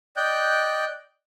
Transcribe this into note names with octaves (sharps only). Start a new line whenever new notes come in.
D5 D#5 G5 F#6 G6